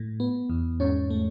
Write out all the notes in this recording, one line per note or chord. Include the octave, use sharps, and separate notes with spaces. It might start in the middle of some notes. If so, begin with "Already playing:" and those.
Already playing: A2
B3
E2
G#2 C#4 C#5
A3